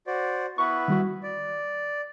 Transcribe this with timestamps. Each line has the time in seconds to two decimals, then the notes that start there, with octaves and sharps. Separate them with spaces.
0.07 F#4 C5 D5
0.58 B3 E4 B4 C#6
0.88 D#3 G3 F#4
1.23 D5